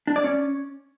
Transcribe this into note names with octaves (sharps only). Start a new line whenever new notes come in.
D4
D5
C#4